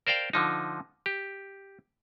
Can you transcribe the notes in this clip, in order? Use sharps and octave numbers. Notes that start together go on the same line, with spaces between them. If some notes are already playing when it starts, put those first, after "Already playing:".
A#4 C5 D5 F5 G5
D3 F3 D#4
G4